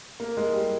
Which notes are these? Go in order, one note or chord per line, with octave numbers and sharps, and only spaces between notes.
A#3
G#3
G3